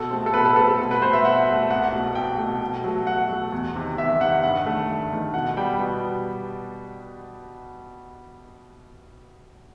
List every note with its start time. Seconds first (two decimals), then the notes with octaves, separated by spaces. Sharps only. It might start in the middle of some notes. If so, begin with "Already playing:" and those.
Already playing: B2 A4
0.10 A3 C4
0.26 A4
0.34 B2 B4
0.45 A4
0.56 A3 C4 A4
0.67 A4
0.80 B2
0.91 B4
1.02 A3 C4 C5
1.13 E5
1.24 B2 F#5
1.47 A3 C4
1.70 C2 F#5
1.92 B2 A3
2.15 C2 G5
2.38 B2 A3
2.61 B2
2.84 F#3 A3
3.06 B2 F#5
3.29 F#3 A3
3.52 E2
3.76 C3 D#3
3.98 E2 E5
4.10 E5
4.21 C3 D#3 F#5
4.43 G2 F#5
4.66 D#3 A3
4.89 G2
5.12 D#3 A3
5.34 B2 F#5
5.57 G3 B3 G5
5.79 B2